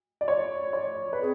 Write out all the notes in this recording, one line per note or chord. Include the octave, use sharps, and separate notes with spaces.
D5
C#5
C#5
B4
C4 G#4